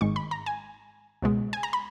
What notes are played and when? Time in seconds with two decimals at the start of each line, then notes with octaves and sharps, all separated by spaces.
0.01 G#1 G#2 D#3 G#3 C#6
0.16 B5
0.31 A#5
0.46 G#5
1.22 C#2 B2 G#3
1.53 G#5
1.63 A#5
1.73 B5